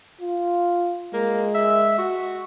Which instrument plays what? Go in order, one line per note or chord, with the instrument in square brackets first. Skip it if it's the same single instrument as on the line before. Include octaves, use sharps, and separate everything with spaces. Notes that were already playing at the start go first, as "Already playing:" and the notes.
[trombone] F4
[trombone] G#3 [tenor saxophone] A#3
[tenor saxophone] E5
F#4